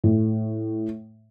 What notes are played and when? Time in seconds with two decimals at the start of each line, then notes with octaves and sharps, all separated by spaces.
0.04 A2